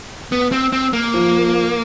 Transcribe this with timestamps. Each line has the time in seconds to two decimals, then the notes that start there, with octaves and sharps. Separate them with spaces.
0.32 B3
0.52 C4
0.72 C4
0.93 A#3
1.14 F3